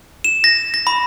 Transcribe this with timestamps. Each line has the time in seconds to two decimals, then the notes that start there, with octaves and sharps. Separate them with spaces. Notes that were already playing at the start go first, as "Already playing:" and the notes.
0.24 E7
0.44 A#6
0.74 A#6
0.87 B5